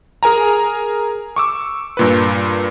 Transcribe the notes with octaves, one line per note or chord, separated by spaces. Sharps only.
G#4 A#4 G#5 A#5
C#6 D6 E6
G2 A#2 B4